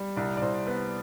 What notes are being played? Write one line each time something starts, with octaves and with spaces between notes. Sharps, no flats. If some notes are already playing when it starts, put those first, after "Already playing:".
Already playing: G3
C2 D5
D5
C2 C5
B3 B4